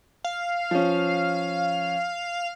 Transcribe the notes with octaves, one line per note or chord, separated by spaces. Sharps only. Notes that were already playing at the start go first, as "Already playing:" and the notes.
F5
F3 C#4